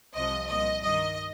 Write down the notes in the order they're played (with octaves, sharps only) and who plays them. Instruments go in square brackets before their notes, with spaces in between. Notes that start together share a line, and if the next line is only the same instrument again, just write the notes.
[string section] C2 C3 F3 D#5
C2 A#2 F3 D#5
G2 D#3 D#5